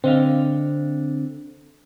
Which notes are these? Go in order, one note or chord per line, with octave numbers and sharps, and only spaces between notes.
D3 C4 D#5 F5